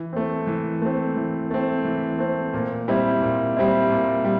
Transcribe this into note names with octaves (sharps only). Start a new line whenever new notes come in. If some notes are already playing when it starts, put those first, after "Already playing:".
Already playing: E3
A3 C4
E3
A3 C4
E3
A3 C4
E3
A3 C4
A#2
G3 C4 E4
A#2
G3 C4 E4
A#2
G3